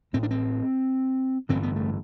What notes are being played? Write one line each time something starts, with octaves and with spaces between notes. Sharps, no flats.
A1 A2 C4
D4
C4
A1 G2 D3 C4
B3
A3